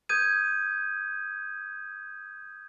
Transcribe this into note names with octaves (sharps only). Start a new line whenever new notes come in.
D#6 G6 G#6 D#7